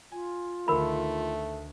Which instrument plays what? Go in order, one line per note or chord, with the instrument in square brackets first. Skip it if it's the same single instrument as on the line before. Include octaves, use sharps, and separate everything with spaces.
[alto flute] F4 [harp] G#5
[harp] D2 D#3 [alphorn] A3 [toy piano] A#4 B5